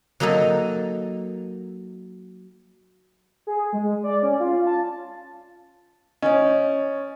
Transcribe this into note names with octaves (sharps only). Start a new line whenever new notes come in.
F#3 A#3 D#4 A4 D#5
G#4
G#3
D5
C#4
F4
A5
C#4 C#5 D#5